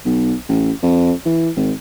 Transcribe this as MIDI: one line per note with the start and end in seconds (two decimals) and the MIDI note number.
0.05 0.35 35
0.49 0.72 33
0.83 1.13 41
1.25 1.50 52
1.56 1.72 32